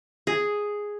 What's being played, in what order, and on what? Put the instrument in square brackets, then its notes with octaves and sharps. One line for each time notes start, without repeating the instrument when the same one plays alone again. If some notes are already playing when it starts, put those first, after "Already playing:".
[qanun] G#4